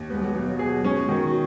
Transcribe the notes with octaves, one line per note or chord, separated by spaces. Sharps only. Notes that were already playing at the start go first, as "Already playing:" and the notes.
Already playing: D#2
G#3 B3
F#3
B2
F#3
G#4
G#3 C#4
D#3 F#4